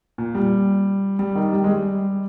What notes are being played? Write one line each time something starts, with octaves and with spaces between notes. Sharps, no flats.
A#2
G3
G3
D#3
G3
G#3
G3